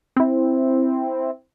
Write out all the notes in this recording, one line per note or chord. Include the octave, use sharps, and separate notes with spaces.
C4 E4